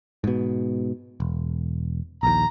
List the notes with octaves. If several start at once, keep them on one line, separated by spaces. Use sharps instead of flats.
G#2 B2
E1
A#1 D#2 A#5